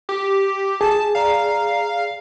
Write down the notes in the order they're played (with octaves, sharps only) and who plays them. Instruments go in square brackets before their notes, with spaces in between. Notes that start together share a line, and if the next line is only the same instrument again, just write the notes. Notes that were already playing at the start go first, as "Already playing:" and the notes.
[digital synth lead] G4
[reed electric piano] G#4 [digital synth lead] A5
[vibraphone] D5 A#5 [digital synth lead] F5